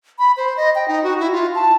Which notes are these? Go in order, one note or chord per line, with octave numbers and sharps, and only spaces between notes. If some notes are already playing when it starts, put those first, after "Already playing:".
B5
C5
D#5
G5
D#4
F#4
E4
F4
A5